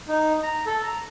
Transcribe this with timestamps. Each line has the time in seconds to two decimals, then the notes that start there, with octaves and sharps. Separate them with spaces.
0.08 D#4
0.43 A#5
0.66 A4
0.83 A#5